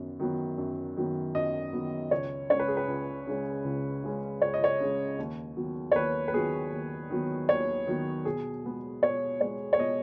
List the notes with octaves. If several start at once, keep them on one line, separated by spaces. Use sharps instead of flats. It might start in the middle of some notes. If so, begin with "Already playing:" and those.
Already playing: F#2 D#3 B3
D#3 F#3 B3
F#2
D#3 F#3 B3
F#2 D#5
D#3 F#3 B3
C#2 C#5
C#3 G#3 C#4 C#5
B4
G#4
B4
C#2
C#3 G#3 C#4
C#2
C#3 G#3 C#4
C#2 C#5
D#5
C#5
C#3 G#3 C#4
D#2
D#3 F#3 B3
C#5
D#2 B4
B4
D#3 F#3 B3 G#4
D#2
D#3 F#3 B3
D#2 C#5
D#3 F#3 B3
B2 G#4
G#3 B3
B2 C#5
G#3 B3 C#5
C#5
B2 D#5